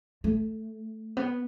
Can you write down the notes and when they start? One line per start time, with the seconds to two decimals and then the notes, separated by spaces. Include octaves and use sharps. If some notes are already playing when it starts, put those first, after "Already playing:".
0.24 A3
1.17 B3